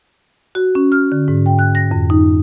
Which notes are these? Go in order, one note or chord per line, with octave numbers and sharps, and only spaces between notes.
F#4
C#4
F6
D3
G#2
G5
F#6
A#6
F2
D#4